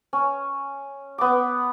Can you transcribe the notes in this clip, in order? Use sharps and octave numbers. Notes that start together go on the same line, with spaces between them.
C#4
B3 D6